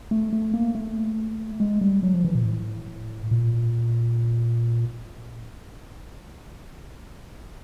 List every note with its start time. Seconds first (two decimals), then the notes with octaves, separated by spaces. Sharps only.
0.11 A3
0.33 A3
0.54 A#3
0.75 A3
1.60 G#3
1.81 G3
2.03 F#3
2.14 F3
2.25 E3
2.35 A#2
2.45 A2
3.31 A#2